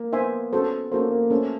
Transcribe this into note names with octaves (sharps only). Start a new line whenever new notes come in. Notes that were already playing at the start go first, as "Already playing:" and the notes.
Already playing: A#3
B3 C5 E5 G#5 C6
C#4 F#4 A4 C5
A#3 C#4 F#4 A4 C5
A#3
A3 C#4 F#4 A4 C5